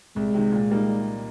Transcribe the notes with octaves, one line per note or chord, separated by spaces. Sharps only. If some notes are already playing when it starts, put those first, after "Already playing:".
C2 G#3
C3 D#3
A#2
G3 A#3 D#4